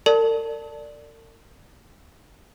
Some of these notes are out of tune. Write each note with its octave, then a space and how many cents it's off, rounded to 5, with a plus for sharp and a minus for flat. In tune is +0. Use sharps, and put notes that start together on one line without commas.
A#4 -45 D5 +0 A5 +0